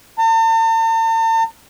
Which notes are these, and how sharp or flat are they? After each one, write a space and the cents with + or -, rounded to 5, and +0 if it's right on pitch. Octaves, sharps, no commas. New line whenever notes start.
A5 +45